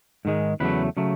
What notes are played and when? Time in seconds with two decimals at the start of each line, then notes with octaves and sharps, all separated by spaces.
0.25 G#2 D#3 G#3
0.60 E2 C#3 F#3 A3 B4
0.97 C#3 F#3 A3